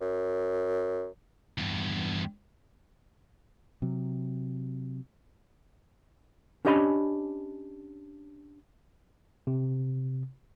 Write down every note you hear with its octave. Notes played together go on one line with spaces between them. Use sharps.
F#2
E2 G2
C3 F#3
C#4 D4 G4 D#5 G#5 B5
C3